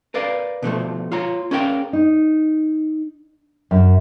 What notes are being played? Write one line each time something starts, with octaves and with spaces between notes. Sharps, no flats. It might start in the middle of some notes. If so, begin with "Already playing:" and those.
A#4 B4 D5 F5
B2 D3 F3 A3
F4 C#5 A#5
C#4 G#4 A#4 F5 G5
D#4
F#2